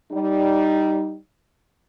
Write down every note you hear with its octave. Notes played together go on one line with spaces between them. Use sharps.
G3 D#4